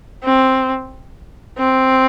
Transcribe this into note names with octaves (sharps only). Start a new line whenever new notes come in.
C4
C4